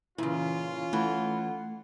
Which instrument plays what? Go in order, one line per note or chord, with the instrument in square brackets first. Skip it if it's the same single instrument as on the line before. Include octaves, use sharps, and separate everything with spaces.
[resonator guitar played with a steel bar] A#2 C#3 [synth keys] E3 [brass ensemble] C#4 F4
[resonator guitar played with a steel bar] E3 [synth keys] A3 [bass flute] F#5